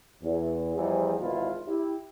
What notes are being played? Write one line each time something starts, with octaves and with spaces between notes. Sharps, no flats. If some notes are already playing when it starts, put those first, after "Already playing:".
E2
E2 F3 G3 D#4 G#4
G#1 E2 B2 E4 F4
E4 G4